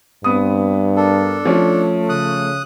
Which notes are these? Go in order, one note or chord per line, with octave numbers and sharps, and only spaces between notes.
G2 B3 C4 D#6
D4 A4 A#4
F3 A3 C#4
C#3 D#6 F#6